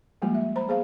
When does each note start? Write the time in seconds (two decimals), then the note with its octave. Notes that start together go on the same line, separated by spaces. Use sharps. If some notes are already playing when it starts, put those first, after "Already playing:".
0.22 F3 G3 G#3 A#3 F4 G4
0.35 E5
0.56 C5 A#5 B5
0.68 B3 G#4 C5 F5